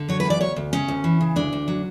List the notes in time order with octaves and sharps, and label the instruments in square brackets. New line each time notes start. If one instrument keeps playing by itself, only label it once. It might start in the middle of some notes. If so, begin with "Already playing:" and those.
Already playing: [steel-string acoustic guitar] D3
F#3 C#5
B4
E2 D5
D2 C#5
D2
C#3 C#4
D2
E3
C#3
D2 D4
D2
F#3